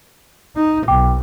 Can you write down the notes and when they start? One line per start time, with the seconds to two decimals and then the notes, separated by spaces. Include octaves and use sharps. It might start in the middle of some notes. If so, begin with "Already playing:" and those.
0.56 D#4
0.88 B1 G5 D6